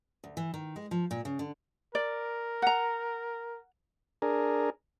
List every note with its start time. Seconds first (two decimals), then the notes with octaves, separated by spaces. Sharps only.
0.24 D2
0.37 E3
0.54 D#3
0.76 G#3
0.91 F3
1.11 A#2
1.25 C#3
1.39 D3
1.95 A#4 D5
2.62 F#5 A#5
4.22 D4 G#4 A#4